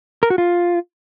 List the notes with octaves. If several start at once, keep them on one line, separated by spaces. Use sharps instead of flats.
A#4
F#4
F4